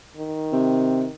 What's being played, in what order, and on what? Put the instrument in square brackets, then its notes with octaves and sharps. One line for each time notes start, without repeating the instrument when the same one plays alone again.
[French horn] D#3
[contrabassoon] C3